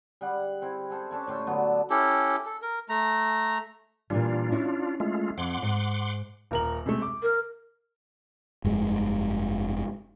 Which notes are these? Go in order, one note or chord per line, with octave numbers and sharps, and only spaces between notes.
G3 G#4 F#5
C4 E4
G#4 A4 C5
C#4 D4 A4 C#6
A2 A3 C6
D3 F#3 B3
C#4 E4 G4 A4
A4
A#4
A3 A#5
A#2 E3 G3 D4 F4
C#4 E4 F#4
G#3 A3 F4
F2 F#5 C6 D6
G#2
D#1 A#4 F#7
C3 G#3 A3
D6
A#4
F1 G2 G#3